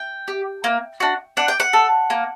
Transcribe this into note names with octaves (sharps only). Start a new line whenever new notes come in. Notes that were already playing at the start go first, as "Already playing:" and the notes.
Already playing: G5
G4
A#3
D4 F#4
D4 F#5
G5
F#5
A4
A#3